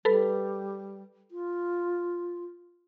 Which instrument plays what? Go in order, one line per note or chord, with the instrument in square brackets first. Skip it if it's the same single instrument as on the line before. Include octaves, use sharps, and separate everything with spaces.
[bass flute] G3 [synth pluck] A4 B4
[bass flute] F4